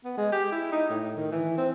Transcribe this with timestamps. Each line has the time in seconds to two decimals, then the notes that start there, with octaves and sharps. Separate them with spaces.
0.04 B3
0.18 G#3
0.32 G4
0.52 E4
0.72 D#4
0.90 A2
1.17 D#3
1.32 E3
1.58 C4